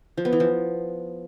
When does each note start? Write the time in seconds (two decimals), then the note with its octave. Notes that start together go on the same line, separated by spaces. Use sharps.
0.17 F3
0.25 B3
0.33 E3
0.40 F3